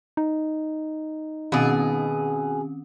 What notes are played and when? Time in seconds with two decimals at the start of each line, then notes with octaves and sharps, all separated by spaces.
0.17 D#4
1.52 B2 D#3 C4 C#4 G#4